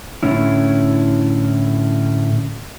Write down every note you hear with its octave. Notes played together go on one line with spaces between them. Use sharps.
A2 D3 C#4 E4